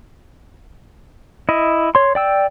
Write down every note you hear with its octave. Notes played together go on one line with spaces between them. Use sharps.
E4 D#5
C#5 C6
D5 G5 E6